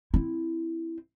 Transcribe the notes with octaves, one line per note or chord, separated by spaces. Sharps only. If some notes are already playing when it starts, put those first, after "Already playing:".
C4 E4